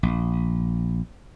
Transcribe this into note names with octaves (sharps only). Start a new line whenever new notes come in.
A#1